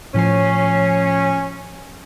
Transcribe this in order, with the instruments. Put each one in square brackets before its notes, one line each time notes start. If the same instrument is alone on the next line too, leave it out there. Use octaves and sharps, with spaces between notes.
[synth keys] A2 F3 C7 [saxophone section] C#4